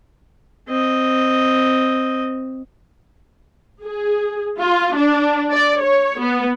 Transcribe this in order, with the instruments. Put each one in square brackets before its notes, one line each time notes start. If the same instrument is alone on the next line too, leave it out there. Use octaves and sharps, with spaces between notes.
[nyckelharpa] C4 D#5
[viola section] G#4
F4
D4
D5
C#5
B3